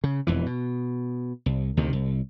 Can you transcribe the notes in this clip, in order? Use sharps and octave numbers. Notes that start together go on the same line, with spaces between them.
C#3
E1 F2 E3
B2
C2
D2 C3 D#3
C2